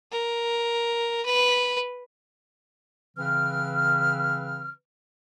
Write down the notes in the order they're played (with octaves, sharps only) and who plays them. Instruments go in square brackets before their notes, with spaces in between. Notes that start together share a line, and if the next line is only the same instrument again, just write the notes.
[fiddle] A#4
B4
[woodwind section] C#3 E3 C4 B4 F6